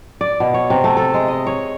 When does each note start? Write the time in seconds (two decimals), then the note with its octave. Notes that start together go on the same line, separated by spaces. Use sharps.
0.21 D5
0.40 B2
0.54 C#5
0.70 C3
0.84 A3
0.97 A4
1.14 G#3
1.28 D#5
1.47 C#5